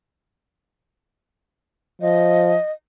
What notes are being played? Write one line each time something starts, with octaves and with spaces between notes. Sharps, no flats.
F3 D#5